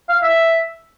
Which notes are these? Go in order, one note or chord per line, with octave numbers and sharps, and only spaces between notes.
F5
E5